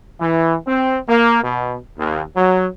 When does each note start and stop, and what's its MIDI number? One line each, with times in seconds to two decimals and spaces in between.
0.20 0.55 52
0.67 0.98 60
1.08 1.39 58
1.43 1.76 47
1.98 2.21 39
2.35 2.67 54